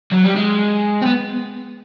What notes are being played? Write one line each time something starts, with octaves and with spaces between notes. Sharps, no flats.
F#3
G3
G#3
C4
B3